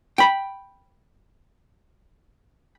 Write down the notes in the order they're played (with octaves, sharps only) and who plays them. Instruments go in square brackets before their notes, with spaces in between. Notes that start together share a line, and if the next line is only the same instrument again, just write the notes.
[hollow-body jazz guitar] G5 B5